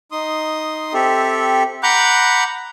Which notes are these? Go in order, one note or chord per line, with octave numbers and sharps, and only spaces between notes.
D#4 C6 D#6
C4 G4 A4 E5
F#5 A#5 B5 D6 F#6 G6